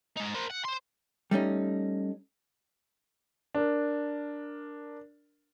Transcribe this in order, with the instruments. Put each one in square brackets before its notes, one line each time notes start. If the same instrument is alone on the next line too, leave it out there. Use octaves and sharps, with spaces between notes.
[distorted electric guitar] G#3 D#4
A#4 C5
F#5
C5 C6
[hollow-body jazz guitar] G3 A3 C#4 D#4
[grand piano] D4 A#4